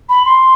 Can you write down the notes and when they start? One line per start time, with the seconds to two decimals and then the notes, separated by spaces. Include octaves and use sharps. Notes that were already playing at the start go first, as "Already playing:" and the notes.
0.09 B5
0.25 C6